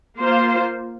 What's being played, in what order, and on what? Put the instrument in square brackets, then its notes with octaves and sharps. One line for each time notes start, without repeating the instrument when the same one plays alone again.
[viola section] A#3 F4 C5